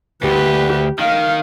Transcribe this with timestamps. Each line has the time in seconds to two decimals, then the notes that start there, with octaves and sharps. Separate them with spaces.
0.23 D2 G4 B4
0.99 D#3 F5